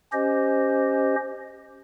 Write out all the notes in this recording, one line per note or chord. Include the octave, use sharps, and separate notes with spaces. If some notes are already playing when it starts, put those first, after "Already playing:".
C#4 G4 C5 D#5